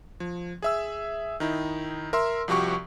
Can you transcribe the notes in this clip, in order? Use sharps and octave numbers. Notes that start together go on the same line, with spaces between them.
F3
G#4 E5 E6
D#3 D#4 E4
A#4 E5 C6 E6
C2 F3 F#4 G4 C#6